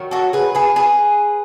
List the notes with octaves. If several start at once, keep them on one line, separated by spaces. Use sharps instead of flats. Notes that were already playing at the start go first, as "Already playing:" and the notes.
Already playing: D#3 F#3
F#4 A4
G#4 B4
G#4 B4
G#4 B4